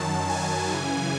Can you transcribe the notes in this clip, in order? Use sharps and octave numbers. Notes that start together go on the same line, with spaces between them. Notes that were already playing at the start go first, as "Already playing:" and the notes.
Already playing: F#2 D#3 F#3 A5
G#5
F#2 C#3 E3